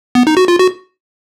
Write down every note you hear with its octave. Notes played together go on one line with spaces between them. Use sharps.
B3
D#4
F#4
F4
F#4